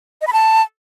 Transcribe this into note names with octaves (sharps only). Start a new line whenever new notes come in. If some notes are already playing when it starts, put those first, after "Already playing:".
D#5
B5
A5